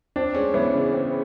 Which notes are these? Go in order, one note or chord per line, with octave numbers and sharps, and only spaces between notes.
C4 D4
G#3 C#4
E3 B3
C#3
C4